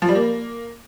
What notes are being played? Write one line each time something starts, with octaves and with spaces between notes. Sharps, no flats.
F3
G3
A#3